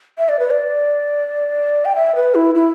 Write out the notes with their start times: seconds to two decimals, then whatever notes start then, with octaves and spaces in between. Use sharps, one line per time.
0.18 E5
0.29 D5
0.39 B4
0.50 D5
1.85 G5
1.95 E5
2.15 B4
2.35 E4
2.55 E4